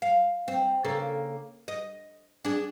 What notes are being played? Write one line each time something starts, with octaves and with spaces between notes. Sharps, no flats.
F5
C4
C#3 A#3 A4
D#5
D4 G#4